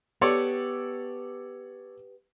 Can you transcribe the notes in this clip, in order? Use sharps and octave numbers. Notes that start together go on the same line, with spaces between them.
B3 G4 A4 C#5 D5